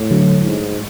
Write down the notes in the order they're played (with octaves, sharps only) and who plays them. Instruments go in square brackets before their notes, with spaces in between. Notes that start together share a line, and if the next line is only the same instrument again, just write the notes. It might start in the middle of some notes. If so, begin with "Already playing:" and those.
Already playing: [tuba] A2
[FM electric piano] D3 F#3
[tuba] G#2